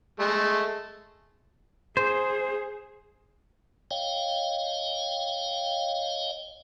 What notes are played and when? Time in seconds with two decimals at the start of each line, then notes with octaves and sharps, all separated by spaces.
0.19 G#3 A3
1.97 G#4 C5
3.91 C#5 D#5 F5 G5